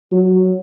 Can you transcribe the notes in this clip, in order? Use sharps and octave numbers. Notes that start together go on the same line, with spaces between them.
F#3